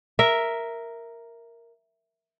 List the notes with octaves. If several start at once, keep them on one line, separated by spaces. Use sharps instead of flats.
A#4 E5